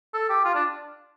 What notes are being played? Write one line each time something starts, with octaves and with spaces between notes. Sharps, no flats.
A4
G4
F4
D4